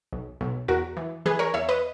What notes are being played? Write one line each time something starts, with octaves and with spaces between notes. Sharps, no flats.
B1
B1
E2 F#4 A#4
E3
E3 G#4 B4
A#4 C#5
E2 C#5 E5
B4 D#5